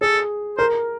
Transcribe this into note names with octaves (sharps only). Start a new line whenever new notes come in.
G#4 A4
A#4 C5